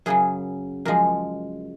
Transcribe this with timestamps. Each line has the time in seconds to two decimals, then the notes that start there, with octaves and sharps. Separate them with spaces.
0.06 F#2 C#3 F#3 G#4
0.85 F#2 F3 G#3 A#4